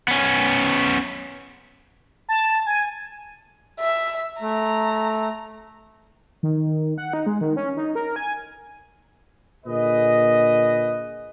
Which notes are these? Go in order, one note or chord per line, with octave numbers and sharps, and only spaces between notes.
B3 C#4
A5
G#5
E5
A3 A#5
D#3
F#5
D#4
G#3
D#3
C#4
D#4
A#4
G#5
A#2 D3 G#4 B4 D#5